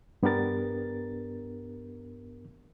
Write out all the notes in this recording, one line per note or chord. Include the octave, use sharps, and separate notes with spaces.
G2 B3 D4 G4 A#4 A6